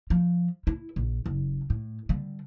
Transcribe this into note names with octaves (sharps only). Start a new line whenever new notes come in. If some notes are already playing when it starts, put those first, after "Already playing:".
F3
E4
A#1
F#1
A2
D3 G3